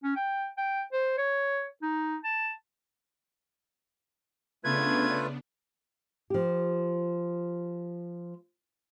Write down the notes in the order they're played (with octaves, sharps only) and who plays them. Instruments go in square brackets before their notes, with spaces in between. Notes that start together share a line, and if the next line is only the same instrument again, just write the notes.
[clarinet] C#4
G5
G5
C5
C#5
D#4
A5
[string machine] C#3 B3 D4 [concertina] A3 F4 B4 [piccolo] G#6
[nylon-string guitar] F3 G4